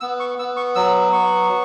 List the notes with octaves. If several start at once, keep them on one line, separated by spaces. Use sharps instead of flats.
B3 E6
C#6
B3 E6
C#6
F#3 E6
B3 C#6